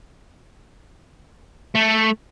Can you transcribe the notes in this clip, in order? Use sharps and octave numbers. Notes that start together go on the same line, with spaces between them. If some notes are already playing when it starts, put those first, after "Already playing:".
A3